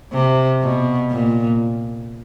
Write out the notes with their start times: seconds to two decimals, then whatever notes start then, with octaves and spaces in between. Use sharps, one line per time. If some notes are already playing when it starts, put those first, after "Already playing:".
0.13 C3
0.62 B2
1.11 A#2